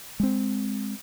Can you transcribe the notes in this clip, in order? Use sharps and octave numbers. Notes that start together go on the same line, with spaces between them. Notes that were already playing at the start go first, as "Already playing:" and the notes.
G#3 C4